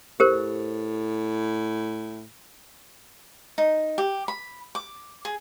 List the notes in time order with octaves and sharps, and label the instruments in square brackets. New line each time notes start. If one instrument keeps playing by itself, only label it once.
[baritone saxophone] A2 [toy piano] G4 A#4 C5
[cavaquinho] D#4
G4
B5
D6
G#4